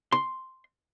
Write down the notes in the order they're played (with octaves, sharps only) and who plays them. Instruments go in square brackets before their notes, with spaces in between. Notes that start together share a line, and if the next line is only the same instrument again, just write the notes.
[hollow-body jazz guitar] C6